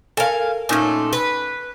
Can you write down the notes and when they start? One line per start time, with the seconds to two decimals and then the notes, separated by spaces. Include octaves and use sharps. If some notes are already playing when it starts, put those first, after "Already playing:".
0.17 A4 A#4 F5 G#5
0.69 A#2 A3 C#4 D#4 G#5
1.13 B4